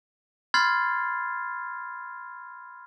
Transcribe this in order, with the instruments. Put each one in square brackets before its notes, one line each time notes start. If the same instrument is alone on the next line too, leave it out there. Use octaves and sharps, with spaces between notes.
[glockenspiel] B5 C6 F6 G#6 A6 C7